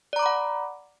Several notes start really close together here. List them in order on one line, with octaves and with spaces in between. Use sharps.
D5 A#5 D6 B5 F#5